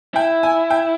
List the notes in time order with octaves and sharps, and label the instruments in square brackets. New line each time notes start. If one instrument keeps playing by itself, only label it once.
[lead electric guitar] E4 [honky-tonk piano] G5
[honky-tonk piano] G#5
G5